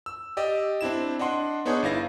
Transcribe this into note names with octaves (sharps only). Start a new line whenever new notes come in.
E6
G4 D5 D#5 E6
C4 D4 E4 E7
D4 D#5 F#5 C6
B3 D4 D#4 G#4 C#5
G1 E4 F5 A#6